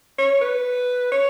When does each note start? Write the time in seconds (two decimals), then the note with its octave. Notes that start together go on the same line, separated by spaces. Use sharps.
0.18 C#5
0.41 B4
1.12 C#5